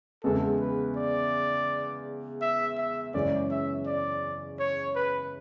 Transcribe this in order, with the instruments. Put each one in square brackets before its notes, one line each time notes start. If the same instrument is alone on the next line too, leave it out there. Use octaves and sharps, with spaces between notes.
[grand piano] E2 C#3 G#3 B3 [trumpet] A4
[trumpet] B4
D5
E5
E5
[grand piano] F#2 C#3 E3 G#3 C#4 [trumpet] D5
[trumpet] E5
D5
C#5
B4